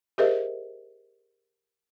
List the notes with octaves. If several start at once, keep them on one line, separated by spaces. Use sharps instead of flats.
G4 G#4 A#4 C5 D#5 E5